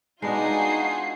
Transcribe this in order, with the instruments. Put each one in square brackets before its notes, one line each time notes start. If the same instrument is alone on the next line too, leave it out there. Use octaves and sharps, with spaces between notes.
[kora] G#3 B3 D4 [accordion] D#4 [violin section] F4 F#4 G#5 [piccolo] C7